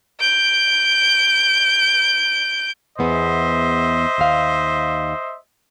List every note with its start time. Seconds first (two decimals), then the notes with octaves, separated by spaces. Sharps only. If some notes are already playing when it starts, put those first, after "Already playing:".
0.20 G6 D7
2.99 E2 B3 G#4 C5 D#5 E5
4.18 D#2 F5